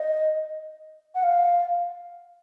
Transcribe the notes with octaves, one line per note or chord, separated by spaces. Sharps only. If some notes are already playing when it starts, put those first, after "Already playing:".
Already playing: D#5
F#5
F5